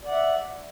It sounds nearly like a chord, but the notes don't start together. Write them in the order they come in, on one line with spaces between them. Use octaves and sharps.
D5 F#5 E5